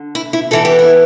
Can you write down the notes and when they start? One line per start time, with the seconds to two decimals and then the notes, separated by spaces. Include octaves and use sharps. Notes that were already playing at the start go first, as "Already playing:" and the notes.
Already playing: D3
0.15 E4
0.33 E4
0.51 E2 E3 B3 A4
0.65 G4
0.79 E4